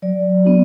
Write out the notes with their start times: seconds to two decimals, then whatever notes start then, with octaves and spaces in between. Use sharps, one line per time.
0.02 F#3 D5
0.45 B3 D4 F#4